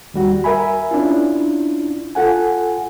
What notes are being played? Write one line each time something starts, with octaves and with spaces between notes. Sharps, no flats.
D#2 G3 F#4
A#4 E5 G#5 B5
C#4 D4 E4 F4
F4 A4 F#5 G#5